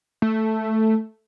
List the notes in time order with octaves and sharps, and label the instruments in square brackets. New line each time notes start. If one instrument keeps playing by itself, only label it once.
[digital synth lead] A3